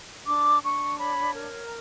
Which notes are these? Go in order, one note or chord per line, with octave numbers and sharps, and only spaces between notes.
D4 D6
D4 C#6
C#5 B5
A#4
A#5